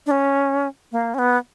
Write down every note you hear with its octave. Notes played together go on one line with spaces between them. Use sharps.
D4
C#4
A#3
C#4
B3